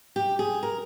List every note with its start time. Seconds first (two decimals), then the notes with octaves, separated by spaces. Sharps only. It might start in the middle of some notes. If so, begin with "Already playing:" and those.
0.16 G4
0.39 G#4
0.63 A#4